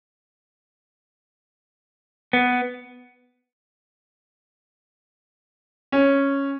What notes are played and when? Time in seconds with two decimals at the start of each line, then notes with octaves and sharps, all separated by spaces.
2.33 B3
5.92 C#4